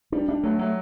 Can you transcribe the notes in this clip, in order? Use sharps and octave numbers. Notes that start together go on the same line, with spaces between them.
G3 D4
G3 D4
F#3 A3
F#3 A3